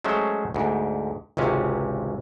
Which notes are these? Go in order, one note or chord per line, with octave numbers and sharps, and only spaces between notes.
F#3 G#3 A3 C#4 C5
D2 G#2
G#1 C#2 C3 C#4